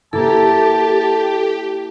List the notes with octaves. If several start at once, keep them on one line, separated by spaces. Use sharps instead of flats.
A#3 E4 G4 A4 A5